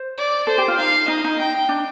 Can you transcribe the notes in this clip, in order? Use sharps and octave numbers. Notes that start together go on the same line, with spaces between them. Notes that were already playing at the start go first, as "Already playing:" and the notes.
Already playing: C5
D5
A4 C5
G4
F4
D#4 F5
D#4 D#5
D#4
D#4 G5
D4